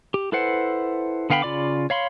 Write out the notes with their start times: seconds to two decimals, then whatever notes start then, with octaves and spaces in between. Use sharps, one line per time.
0.14 G4
0.32 E4 A4 B4 C5 F#5
1.30 D3 B3 F5 G5 B5
1.42 C#3 F4 D5 B5 D6
1.90 C#5 F5 B5 C6